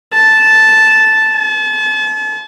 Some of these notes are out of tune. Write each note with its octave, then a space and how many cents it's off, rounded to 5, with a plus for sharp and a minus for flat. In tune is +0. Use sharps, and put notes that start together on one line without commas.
A5 -5
A5 -35